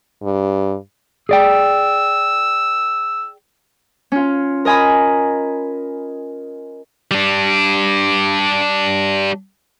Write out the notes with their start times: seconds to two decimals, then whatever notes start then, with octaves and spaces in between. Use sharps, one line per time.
0.23 G2
1.29 G#4 D5 G5 E6
4.12 C#4 F4
4.65 A#4 D#5 G#5 A#5 B5
7.11 G3 D4